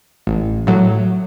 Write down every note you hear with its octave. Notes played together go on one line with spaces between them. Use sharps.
A1
A2 F#3